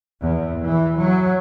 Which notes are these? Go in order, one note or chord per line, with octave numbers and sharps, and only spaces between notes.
E2
E3
F#3